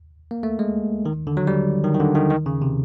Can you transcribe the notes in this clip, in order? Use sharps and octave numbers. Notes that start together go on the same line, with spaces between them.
A#3
A3
G#3
D#3
D3
F#3
G3
D#3
D#3
D3
D#3
D#3
C#3
C3